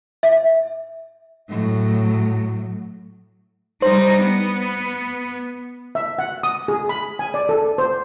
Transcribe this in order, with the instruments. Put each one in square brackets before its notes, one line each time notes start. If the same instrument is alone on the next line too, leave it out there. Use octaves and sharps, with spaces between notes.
[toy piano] E5
[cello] A2 F#3
[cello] G3 D#4 [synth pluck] C5
[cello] B3
[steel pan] E5
F#5
D#6
G#4
B5
G#5
D5
A4
C5